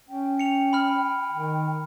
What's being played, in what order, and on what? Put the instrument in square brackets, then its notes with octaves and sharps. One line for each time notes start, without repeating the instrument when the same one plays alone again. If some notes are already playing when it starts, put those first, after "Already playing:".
[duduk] C#4 [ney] G5
[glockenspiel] C#7 F7
B5 F6
[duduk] D#3